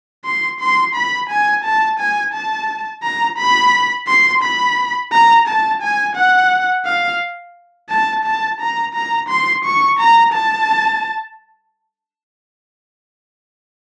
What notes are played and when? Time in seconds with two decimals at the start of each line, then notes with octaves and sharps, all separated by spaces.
0.25 C6
0.60 C6
0.95 B5
1.29 G#5
1.64 A5
1.99 G#5
2.34 A5
3.03 A#5
3.38 B5
4.07 C6
4.43 B5
5.13 A#5
5.47 A5
5.82 G#5
6.16 F#5
6.85 F5
7.90 A5
8.24 A5
8.60 A#5
8.94 A#5
9.29 C6
9.65 C#6
9.99 A#5
10.33 A5